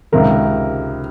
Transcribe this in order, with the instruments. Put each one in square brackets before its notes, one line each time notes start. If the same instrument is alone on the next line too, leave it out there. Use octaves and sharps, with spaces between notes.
[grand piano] C#2 C3 D#3 A#4